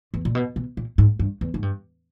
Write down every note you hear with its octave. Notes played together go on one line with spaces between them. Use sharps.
E2
A#2
B2
B2
A#2
G#2
G2
E2
G#2
G2